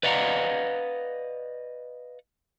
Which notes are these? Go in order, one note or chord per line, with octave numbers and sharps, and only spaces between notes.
B4 D5 D#5 F5 F#5 A#5